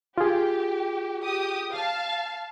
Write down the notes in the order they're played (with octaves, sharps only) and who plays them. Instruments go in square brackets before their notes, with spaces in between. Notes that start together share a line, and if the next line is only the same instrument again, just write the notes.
[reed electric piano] F4 G#4 [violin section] G4
[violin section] G4 D#6
F5 A5